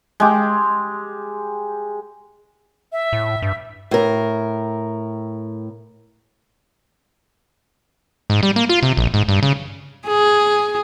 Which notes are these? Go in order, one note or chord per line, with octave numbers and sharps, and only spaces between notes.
G#3 G4
E5
A2
G2
A2 A#4
G#2
G3
A#3
F4
C3
A#1
G#2
G2
C#3
G#4